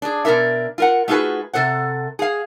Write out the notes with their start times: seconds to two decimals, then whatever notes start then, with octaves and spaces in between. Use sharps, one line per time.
0.02 D4 G#4
0.25 B2 F3 D4 A#4 E5
0.78 F4 A#4 F#5
1.08 A3 D#4 F4 F#4 G#4 B4
1.53 C3 A4 C5 F#5
2.19 G#4 F5